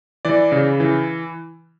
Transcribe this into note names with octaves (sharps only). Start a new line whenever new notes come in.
E3 D5
C#3
E3